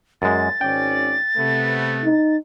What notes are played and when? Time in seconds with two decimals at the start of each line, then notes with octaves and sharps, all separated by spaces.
0.22 F#2 G#3 A6
0.61 G#1 C#4 D5 G5
1.37 C3 A3 B3
2.05 D#4